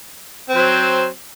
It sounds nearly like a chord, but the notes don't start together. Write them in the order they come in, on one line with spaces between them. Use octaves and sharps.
C4 C5 F#3